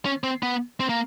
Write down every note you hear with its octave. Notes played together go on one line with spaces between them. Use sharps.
C#4
C4
B3
C4
A#3